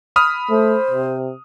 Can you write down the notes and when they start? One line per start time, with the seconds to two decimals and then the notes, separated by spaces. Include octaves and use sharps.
0.16 B5 D#6 F6
0.50 A3 C5
0.91 C3